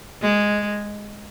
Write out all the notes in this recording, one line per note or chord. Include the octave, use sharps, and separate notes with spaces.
G#3